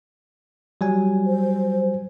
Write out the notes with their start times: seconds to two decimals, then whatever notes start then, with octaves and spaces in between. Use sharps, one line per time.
0.81 F#3 G3 G#5
1.26 C5